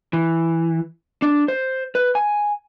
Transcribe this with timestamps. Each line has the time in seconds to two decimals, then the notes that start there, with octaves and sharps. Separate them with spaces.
0.13 E3
1.22 D4
1.48 C5
1.95 B4
2.15 G#5